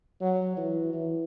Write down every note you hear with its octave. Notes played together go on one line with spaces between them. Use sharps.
F#3
E3
E3